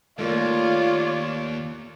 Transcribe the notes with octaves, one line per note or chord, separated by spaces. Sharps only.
D#2 A3 A#3 F4 C#5 D5